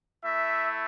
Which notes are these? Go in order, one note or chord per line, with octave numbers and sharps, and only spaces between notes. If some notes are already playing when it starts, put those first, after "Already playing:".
A3 E4 E5